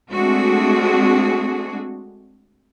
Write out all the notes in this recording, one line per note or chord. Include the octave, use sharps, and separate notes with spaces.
G#3 A3 C4 D4 F#4 G#4